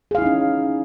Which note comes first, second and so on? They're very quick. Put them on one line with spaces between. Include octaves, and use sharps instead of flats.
G#4 F5 E4 D#4 C#4